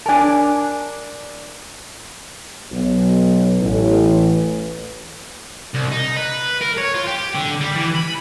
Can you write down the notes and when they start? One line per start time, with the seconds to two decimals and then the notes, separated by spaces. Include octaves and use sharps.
0.06 D4 A#4 G#5 A5
2.72 B1
3.59 A1
5.74 C2
5.91 D#4
6.16 B4
6.61 A#4
6.78 C#5
6.94 F4
7.08 G4
7.35 D3
7.61 G3
7.76 E3
7.95 B5